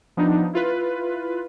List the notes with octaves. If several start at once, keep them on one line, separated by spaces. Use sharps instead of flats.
F3 B3 D4 D#4
E4 F4 B4